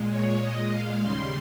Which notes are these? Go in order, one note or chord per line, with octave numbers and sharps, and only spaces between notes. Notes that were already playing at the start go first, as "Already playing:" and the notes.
Already playing: A#2 G#3
C#5
D#5
F5
D#2 C#3 G3 C6